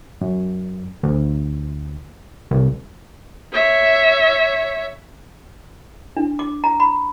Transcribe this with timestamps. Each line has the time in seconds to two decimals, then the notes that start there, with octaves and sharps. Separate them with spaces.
0.21 F#2
1.03 D2
2.51 C2
3.53 C#5 E5
6.17 D4
6.39 D6
6.64 A#5
6.80 B5